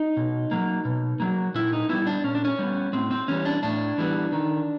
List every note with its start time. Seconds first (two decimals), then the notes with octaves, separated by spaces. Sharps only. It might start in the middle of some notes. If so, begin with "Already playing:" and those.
Already playing: D#4
0.17 B2
0.51 F#3 A#3
0.85 B2
1.20 F#3 A#3
1.55 A#2 E4
1.73 D#4
1.89 G3 B3 E4
2.07 D4
2.24 A#2 C#4
2.35 D4
2.45 C#4
2.59 G3 B3
2.93 A2 C4
3.11 C4
3.28 E3 G3 B3 C#4
3.45 D4
3.63 A2 D4
3.98 E3 G3 B3
4.32 D#3